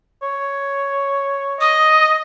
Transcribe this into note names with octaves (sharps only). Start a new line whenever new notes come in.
C#5
D#5 D#6